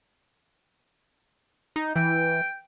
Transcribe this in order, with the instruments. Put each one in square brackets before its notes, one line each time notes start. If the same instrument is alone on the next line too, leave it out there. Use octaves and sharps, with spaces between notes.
[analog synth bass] D#4
[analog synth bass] E3 [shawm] G5